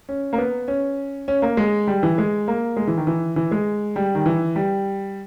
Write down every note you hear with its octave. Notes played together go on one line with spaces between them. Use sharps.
C#4
A#3
B3
C#4
C#4
A#3
G#3
G3
E3
G#3
A#3
G#3
E3
D#3
E3
E3
G#3
G3
D#3
E3
G3